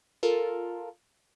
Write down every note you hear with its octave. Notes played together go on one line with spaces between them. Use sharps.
F4 A4 A#4